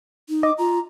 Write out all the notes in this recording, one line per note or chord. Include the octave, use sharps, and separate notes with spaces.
D#4
D#5 D6
F4 A#5